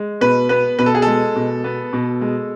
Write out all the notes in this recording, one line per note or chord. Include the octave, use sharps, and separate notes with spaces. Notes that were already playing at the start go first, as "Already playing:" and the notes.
Already playing: G#3
B2 B4
B3 B4
B2 B4
A4
G#4
G#3 A4
B2
B3
B2
G#3